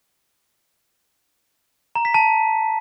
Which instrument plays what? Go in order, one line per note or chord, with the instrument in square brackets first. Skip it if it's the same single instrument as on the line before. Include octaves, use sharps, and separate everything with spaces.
[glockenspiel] A#5
B6
A5